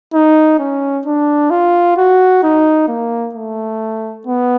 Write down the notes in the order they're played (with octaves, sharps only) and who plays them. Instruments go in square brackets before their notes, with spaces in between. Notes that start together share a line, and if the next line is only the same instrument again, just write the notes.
[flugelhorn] D#4
C#4
D4
F4
F#4
D#4
A#3
A3
B3